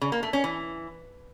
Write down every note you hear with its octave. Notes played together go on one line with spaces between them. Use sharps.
C#3
A#3
A3
C#4
E3